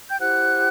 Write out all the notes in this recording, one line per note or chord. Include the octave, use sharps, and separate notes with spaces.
G5 G6
E4 G4 C5 F#5 F#6